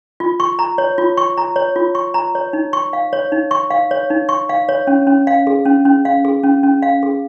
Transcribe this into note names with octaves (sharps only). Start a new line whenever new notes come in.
F4
C#6
A#5
C#5
F4
C#6
A#5
C#5
F4
C#6
A#5
C#5
D#4
C#6
F5
C#5
D#4
C#6
F5
C#5
D#4
C#6
F5
C#5
C#4
C#4
F5
G#4
C#4
C#4
F5
G#4
C#4
C#4
F5
G#4